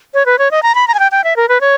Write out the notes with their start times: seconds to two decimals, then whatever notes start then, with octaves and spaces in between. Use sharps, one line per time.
0.14 C#5
0.26 B4
0.39 C#5
0.51 D#5
0.63 A#5
0.75 B5
0.88 A#5
0.94 G#5
0.99 G5
1.12 G5
1.24 E5
1.36 A#4
1.49 B4
1.61 C#5